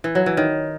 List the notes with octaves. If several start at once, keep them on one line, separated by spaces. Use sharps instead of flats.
E3
F#3
E3
D#3